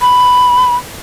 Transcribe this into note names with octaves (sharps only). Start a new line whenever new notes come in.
B5